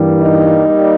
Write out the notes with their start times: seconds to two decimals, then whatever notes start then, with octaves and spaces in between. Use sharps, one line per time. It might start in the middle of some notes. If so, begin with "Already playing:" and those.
Already playing: G2 E3 G3 A#3
0.21 D#4
0.66 G3 A#3